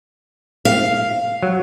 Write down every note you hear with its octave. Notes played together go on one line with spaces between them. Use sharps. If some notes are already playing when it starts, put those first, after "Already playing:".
F5
F#3